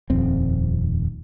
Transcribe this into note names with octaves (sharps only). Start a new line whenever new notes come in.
D#1 F2 C4